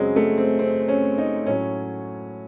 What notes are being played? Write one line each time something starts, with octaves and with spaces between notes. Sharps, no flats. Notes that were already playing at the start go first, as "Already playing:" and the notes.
Already playing: F#2 C#3 F#3 G#3 C4
A3
C4
C4
C#4
D#4
A2 F#3 C#4